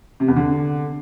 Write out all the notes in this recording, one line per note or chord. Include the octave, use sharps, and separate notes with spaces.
C3
E2
D3